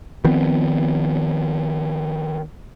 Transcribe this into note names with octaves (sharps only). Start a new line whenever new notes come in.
D#3 F3 B3 C4